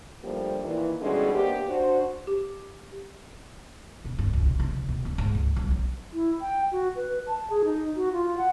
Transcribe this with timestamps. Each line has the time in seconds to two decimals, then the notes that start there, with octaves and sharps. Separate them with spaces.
0.23 F3 G3 A3 A#3 D4 G4
0.62 A#2 D#3 E3
1.00 B2 D3 E3 G3 G#3 C#4
1.32 C3 A#3 B3 D4 G4
1.67 D4 F#4 C5
2.27 G4
4.05 B2
4.19 G2
4.33 C#2
4.46 B1
4.60 C2
4.76 D2
4.89 B2
5.05 D1
5.18 G#2
5.35 C#2
5.56 C2
5.71 F#3
6.13 E4
6.41 G5
6.72 F#4
6.96 B4
7.27 A5
7.50 G#4
7.65 D#4
7.96 F#4
8.12 F4
8.37 F#5